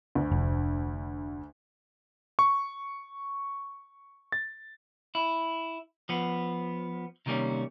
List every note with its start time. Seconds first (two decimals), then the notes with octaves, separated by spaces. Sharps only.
0.15 D2
0.32 F1
2.39 C#6
4.32 A6
5.15 E4
6.09 F3 B3
7.26 C3 D#3 G3 A#3 C#4